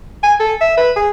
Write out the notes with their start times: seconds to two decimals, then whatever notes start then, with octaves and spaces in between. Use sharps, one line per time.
0.23 G#5
0.40 A4
0.61 E5
0.77 B4
0.96 G#4